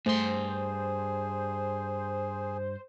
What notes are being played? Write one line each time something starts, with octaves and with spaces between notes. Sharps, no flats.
G2 A3 G#4 C5 C6